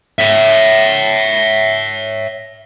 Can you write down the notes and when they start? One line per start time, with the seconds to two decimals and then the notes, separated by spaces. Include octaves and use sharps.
0.19 C#5 E5